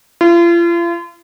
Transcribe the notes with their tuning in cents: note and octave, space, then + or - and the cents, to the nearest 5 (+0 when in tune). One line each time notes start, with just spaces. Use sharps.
F4 -40